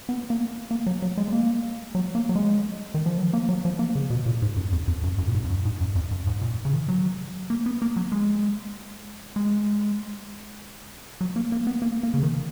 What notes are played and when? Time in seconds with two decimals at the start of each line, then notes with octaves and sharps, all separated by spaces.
0.09 B3
0.30 A#3
0.71 A#3
0.86 F#3
1.02 F#3
1.17 G#3
1.28 G#3
1.32 A#3
1.95 F#3
2.15 A#3
2.29 F#3
2.36 G#3
2.94 D#3
3.06 F3
3.18 F#3
3.33 A#3
3.49 F#3
3.65 F3
3.79 A#3
3.95 C#3
4.10 B2
4.26 A#2
4.42 G#2
4.56 F#2
4.72 F2
4.88 F2
5.03 F#2
5.18 F#2
5.27 A#2
5.35 G#2
5.44 F2
5.50 F#2
5.65 G#2
5.81 F#2
5.95 F2
6.11 F#2
6.27 G#2
6.42 A#2
6.65 C#3
6.73 D#3
6.88 F#3
7.50 A#3
7.66 B3
7.82 A#3
7.96 F#3
8.12 G#3
9.36 G#3
11.21 F#3
11.36 A#3
11.52 A#3
11.67 B3
11.82 A#3
12.03 A#3
12.14 C#3
12.23 D#3